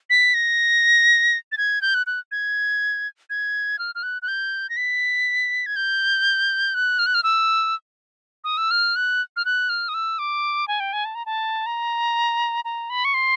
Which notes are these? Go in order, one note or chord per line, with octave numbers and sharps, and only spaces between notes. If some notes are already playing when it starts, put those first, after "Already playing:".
B6
A#6
A6
G#6
G6
F#6
F#6
G#6
G#6
F6
F6
F#6
F#6
G6
A#6
B6
G#6
G6
F#6
F6
F#6
F6
E6
D#6
E6
F6
F#6
F6
F#6
F6
D#6
E6
D6
G#5
G5
G#5
A5
A#5
A5
A#5
A#5
B5
C#6
C6